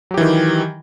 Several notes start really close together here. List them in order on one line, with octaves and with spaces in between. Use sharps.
F#3 G4 E3 D#3